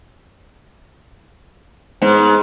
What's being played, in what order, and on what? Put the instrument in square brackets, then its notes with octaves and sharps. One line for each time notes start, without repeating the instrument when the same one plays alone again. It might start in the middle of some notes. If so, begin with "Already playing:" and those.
[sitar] G#2 [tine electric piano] G#3 B3 C5